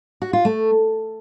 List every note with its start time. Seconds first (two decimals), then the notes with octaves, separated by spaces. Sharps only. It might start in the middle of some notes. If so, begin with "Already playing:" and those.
0.22 F#4
0.33 F4
0.45 A3